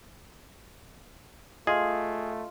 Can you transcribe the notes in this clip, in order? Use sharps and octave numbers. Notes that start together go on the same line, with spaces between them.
A3 F4 G#4 D#5